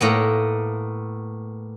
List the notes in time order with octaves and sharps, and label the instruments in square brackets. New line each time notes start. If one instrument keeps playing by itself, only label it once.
[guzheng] A2 A#3 B3